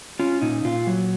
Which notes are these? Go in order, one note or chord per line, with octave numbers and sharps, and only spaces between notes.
C#4 F4
A#2 D#4
A#2 F4
F#3